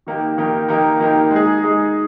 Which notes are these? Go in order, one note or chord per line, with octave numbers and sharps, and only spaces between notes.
D#3 A#3 D#4 G4 A#4
D#3 A#3 D#4 G4 A#4
D#3 A#3 D#4 G4 A#4
D#3 A#3 D#4 G4 A#4
G#3 D#4 G#4
G#3 D#4 G#4